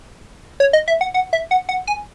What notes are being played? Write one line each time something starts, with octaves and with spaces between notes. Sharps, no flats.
C#5
D#5
E5
F#5
F#5
E5
F#5
F#5
G#5